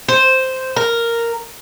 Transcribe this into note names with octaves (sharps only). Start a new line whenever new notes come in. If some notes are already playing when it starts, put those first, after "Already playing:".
C5
A#4